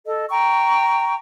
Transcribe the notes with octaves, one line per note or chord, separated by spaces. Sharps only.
A4 D#5
G5 A#5 C#6